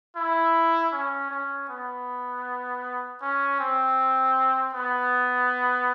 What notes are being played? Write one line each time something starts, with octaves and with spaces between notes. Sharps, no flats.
E4
C#4
C#4
B3
C#4
C4
B3